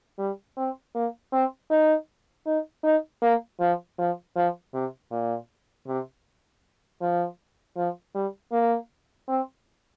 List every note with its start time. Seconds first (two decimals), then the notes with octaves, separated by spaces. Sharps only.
0.19 G3
0.57 C4
0.95 A#3
1.33 C4
1.71 D#4
2.46 D#4
2.84 D#4
3.22 A#3
3.60 F3
3.99 F3
4.36 F3
4.74 C3
5.12 A#2
5.87 C3
7.02 F3
7.77 F3
8.15 G3
8.52 A#3
9.29 C4